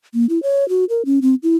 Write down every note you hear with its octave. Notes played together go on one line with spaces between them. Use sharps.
A#3
E4
C#5
F#4
A#4
C#4
C4
E4